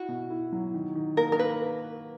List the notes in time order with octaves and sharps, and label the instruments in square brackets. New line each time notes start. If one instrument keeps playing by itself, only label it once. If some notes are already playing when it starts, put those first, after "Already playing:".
Already playing: [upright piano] E4 [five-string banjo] F#4
[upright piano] B2
E4
F#3
D#3
D#3
[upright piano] A#3 [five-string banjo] A#4
[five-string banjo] A#4
[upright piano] A#3 [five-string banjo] B4